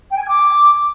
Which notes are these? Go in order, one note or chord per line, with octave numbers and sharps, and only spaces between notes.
G5
G#5
G#6
D6